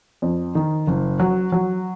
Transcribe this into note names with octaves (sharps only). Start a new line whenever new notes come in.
F2
D#3
F#1
F#3
F#3